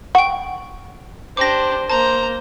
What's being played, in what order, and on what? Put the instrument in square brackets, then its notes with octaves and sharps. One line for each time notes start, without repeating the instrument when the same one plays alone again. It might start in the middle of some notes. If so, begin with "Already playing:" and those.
[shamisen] F#5 [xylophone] G5 C#6
[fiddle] D4 G4 [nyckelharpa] C5 [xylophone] D6 A#6
[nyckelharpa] A#3 C5 [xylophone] A5 [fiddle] A#5